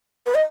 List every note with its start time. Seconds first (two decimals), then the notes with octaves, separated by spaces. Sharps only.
0.26 B4
0.34 D#5